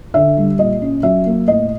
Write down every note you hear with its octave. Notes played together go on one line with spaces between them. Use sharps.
D3 E5
G3
A#2 D#5
C#4
F#3 E5
A#3
A2 D#5